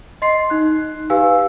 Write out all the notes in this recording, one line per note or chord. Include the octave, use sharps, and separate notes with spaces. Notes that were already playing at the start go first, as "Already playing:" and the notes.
D#5 C6 C7
D#4 F#6
G4 B4 F5 G#5 E6